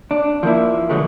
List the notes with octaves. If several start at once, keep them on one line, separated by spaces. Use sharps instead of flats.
D4
F3 A#3 E4
B2 D3 F#3 G#3 A3